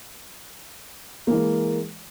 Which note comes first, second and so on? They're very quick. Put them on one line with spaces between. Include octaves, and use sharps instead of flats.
A#3 E3 G#3